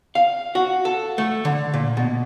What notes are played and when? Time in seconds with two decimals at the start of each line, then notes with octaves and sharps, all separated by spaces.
0.15 F5
0.55 F#4
0.85 A4
1.18 A3
1.45 D3
1.74 A#2
1.97 B2